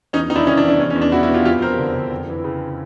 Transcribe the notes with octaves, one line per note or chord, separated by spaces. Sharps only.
E2 C#4 D#4
D#3 D#4
D4 E4
C3 C#4 D#4
D4
E2
D4
E2 C#4
C#4
E2
D4
B2 E4 F#4
E4 F#4
B2
F4 G4
F2 F4 G4
F2 A#4 C5
D3
D3
F2
E3
C#3